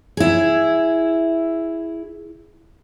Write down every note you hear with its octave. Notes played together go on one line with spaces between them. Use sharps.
E4 G#4